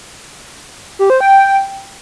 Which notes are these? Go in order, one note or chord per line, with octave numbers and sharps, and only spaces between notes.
G4
C5
G5